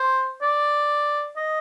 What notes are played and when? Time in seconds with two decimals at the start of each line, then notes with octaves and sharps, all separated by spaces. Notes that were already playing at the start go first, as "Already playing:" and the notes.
Already playing: C5
0.42 D5
1.36 D#5